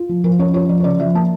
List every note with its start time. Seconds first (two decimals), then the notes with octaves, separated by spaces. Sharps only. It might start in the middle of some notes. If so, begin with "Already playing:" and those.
Already playing: F4
0.09 F3
0.24 F3 A#4
0.39 C#4 C#5
0.53 F4 C#5
0.69 F3 D5
0.80 C#5
0.84 C#3 D5
0.99 F3 E5
1.15 A#3 A5